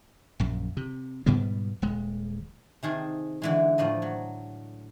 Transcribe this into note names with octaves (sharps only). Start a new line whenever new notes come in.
A#1 F#2
C3
G#2 B2 G3 B3
D#1 G#3
C3 D#3 G#4 A5
D3 E3 G#3
A2 F3 D4 D#5
F#3